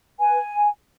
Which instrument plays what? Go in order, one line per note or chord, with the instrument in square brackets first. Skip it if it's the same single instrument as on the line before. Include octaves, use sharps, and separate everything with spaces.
[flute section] B4 G#5